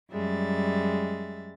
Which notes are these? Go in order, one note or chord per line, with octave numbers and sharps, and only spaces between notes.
F#2 G3 G#3 E5 A6